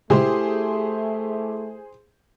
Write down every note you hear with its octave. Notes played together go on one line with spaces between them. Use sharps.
A#2 C#3 G#3 A3 E4 G4 G#4 C5